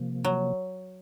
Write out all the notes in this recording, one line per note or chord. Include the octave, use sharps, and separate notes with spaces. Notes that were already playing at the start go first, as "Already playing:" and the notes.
Already playing: C3 F3 A#3
F#3